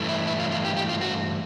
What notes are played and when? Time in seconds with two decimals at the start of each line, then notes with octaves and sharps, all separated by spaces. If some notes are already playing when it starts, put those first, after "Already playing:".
Already playing: G2 E3 A3
0.09 E4
0.27 E4
0.39 F4
0.51 F4
0.65 G4
0.77 G4
0.89 F4
1.01 F#4